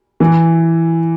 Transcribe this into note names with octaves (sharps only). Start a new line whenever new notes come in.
E3